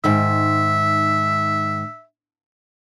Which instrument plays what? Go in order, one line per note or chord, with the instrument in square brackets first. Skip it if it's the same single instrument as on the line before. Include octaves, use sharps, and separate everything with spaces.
[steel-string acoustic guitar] G#2 D#3 [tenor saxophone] E5